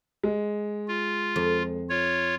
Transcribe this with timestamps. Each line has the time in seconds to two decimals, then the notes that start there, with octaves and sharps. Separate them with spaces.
0.24 G#3
0.88 F4
1.36 F2
1.89 F4 C#5